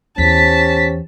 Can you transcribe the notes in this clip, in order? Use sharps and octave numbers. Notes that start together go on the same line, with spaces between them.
E2 E3 C#4 G4 C5 A5 B6